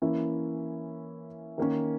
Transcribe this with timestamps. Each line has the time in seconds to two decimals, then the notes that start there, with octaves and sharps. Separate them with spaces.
0.02 E3 A#3 C#4 E4
1.58 D#3 A#3 C#4